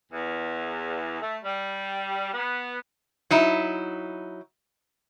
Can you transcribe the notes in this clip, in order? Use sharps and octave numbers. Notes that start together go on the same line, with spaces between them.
E2
A3
G3
B3
F#3 D#4 E4